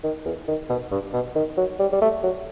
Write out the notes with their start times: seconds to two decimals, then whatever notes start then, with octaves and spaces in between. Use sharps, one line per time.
0.04 D#3
0.25 E2
0.48 D#3
0.70 B2
0.92 G2
1.13 B2
1.36 D#3
1.57 F#3
1.80 G3
1.92 G3
2.02 A3
2.23 F#3